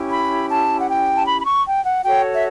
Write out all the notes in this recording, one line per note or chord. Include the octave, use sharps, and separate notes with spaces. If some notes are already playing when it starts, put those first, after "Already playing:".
Already playing: C#4 E4 G4
B5
A5
F#5
G5
A5
B5
B5
C#6
G5
F#5
F#4 A4 C#5 G5
E5